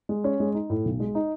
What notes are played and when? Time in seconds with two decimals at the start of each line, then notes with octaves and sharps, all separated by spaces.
0.09 G#3
0.24 C#4
0.40 G#3
0.55 D#4
0.70 A2
0.85 B1
1.00 G#3
1.15 D#4